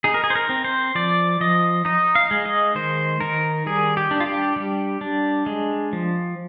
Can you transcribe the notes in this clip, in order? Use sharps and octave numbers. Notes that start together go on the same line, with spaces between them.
D#4 G#4
A#4
G#4
C5
A#4
C4
C5
F3 D5
F3 D#5
D#4 D#5
F5
G#3
D#5
D#3 C5
D#3 A#4
G3 G#4
G4
D4
F4
G4
G3
D4
G#3
F3